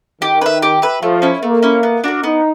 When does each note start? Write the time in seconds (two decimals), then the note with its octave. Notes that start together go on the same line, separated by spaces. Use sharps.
0.22 D#3 G4
0.41 B4 E5
0.62 G4
0.82 B4 E5
1.02 F3 A3
1.22 C#4 E4
1.43 A3 A#3
1.63 C#4 E4
1.83 B3
2.04 D4 F#4 A#4
2.23 B3 D#4